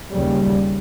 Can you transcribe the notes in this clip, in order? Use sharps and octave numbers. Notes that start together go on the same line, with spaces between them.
D#2 C#3 G3